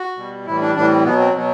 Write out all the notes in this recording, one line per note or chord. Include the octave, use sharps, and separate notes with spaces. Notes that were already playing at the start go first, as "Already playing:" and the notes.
Already playing: F#4
B2 G3
A2 E3 G3 E4
D4
A2 E3 G3 D4
C4
B2 F#3 B3
C4
B2 F#3